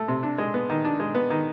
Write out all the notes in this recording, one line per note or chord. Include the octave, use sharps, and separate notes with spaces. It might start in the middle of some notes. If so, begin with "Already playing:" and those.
Already playing: A3
C3
D4
G#3
B3
D#3
D4
G#3
B3
D#3